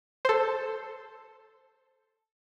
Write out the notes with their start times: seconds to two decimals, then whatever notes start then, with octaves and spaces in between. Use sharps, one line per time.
0.25 A4 C5